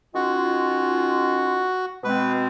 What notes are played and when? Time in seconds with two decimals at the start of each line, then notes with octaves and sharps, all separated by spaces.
0.15 D#3 G#3 C#4 F4 F#4
2.04 B2 G#3 C4 B4